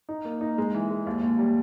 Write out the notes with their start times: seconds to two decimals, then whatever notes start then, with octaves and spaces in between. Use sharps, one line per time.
0.09 D#4
0.25 A#3
0.41 D#4
0.58 G#3
0.74 E3
0.90 G#3
1.07 D#2
1.23 D#2
1.39 G3